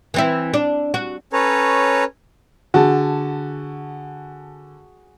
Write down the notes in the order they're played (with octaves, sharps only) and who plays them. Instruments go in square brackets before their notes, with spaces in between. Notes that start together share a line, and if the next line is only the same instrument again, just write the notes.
[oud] E3 C4 E4
D4
F#4
[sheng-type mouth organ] C#4 A4 B4 C#5 A#5
[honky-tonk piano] D3 A5 [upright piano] F#4 G#4